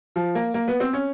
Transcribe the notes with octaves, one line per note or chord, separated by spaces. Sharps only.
F3
A#3
A#3
B3
C4
C#4